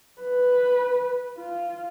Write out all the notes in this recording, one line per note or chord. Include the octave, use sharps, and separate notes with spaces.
B4
F4